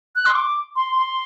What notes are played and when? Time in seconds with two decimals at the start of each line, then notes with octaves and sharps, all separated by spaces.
0.16 F#6
0.26 C6
0.35 D6
0.76 C6
0.96 C6